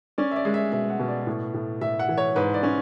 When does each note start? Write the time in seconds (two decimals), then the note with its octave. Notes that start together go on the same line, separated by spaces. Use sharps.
0.18 C#4 D5
0.31 E5
0.36 D5
0.45 G#3
0.54 E5
0.72 B2 E5
0.90 F#5
1.00 B2
1.08 D5
1.26 A2
1.54 A2
1.81 A2 E5
1.99 F#5
2.08 E3
2.17 C#5
2.36 G#2 B4
2.54 D5
2.63 C#4